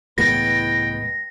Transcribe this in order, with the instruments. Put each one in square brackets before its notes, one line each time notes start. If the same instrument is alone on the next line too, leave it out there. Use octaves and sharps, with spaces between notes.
[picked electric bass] C#2 A2 E3 [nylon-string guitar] G#3 B3 [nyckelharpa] B4 G5 [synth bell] A#6